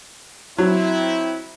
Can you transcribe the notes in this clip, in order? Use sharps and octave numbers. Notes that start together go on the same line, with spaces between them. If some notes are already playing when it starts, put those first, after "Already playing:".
F#3 C4 E4